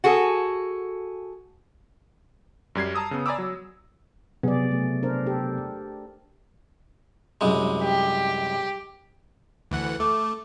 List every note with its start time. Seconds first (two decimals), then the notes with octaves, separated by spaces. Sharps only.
0.04 F#4 G#4 A4
2.75 F#2 G3 G#6 C7
2.95 A5 A#5 D#6 E6
3.11 C#3 B3
3.26 D5 G#5 A#5 B5 D6 E6
3.38 F#3
4.43 C3 F#3 B3 G#4 D5
4.71 A3
5.03 D4 A#4 C5
5.26 G4 A4
7.41 C2 F#2 G#3
7.82 G4
9.71 D2 E3 F#5
10.00 A3 D6